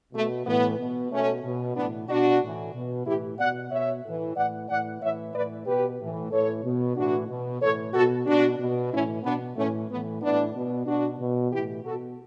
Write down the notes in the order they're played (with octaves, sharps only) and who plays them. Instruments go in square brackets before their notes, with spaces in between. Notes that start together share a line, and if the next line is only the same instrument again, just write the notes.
[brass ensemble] B2 A3
A2 E3 B3
B2
B2 A3 C#4
B2
A2 E3 B3 D4
B2 D4 F#4
A2 E3
B2
A2 E3 E4 G4
B2 D5 F#5
B2 C#5 E5
A2 E3
A2 E3 D5 F#5
A2 E3 D5 F#5
A2 E3 C#5 E5
A2 E3 B4 D5
B2 G4 B4
A2 E3
A2 E3 A4 C#5
B2
A2 E3 D4 F#4
B2
A2 E3 A4 C#5
B2 F#4 A4
B2 D4 F#4
B2
A2 E3 C#4 E4
B2 B3 D4
A2 E3 A3 C#4
A2 E3 B3
A2 E3 B3 D4
B2
B2 D4 F#4
B2
A2 E3 E4 G4
B2 F#4 A4